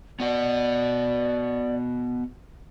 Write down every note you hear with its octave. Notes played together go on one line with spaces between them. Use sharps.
B3 F#4 D5 F#5